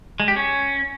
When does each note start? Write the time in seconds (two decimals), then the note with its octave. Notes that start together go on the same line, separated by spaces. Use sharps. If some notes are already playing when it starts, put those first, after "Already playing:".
0.20 G#3
0.28 G4
0.36 C#4